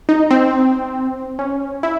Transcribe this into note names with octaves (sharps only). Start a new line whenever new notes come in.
D#4
C4
C#4
E4